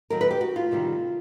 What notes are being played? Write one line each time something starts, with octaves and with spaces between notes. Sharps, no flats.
D#2 D#3 F#3 A#4
B4
G4
F#4
F4
D2 C3 D#3 G3